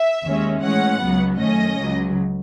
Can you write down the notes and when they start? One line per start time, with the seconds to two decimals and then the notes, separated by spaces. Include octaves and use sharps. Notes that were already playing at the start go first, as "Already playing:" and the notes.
Already playing: E5
0.24 D#2 D#3 G#3 C#4
0.63 A2 E3 G#3 C#4 F#5
1.01 C#2 C#3 F#3 B3
1.39 F#2 D#3 A3 C#4 D#5
1.78 C#2 C#3 F#3